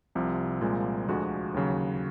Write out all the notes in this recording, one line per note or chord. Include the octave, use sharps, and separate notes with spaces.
C2 C3 F3
C2 A#2 F3 G#3
D2 D3 F3 G#3 F#4
D#2 C#3 F#3